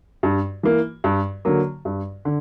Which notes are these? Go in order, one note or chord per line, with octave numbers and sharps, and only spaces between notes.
G2
E3 A#3
G2
D3 F#3 A#3
G2
D3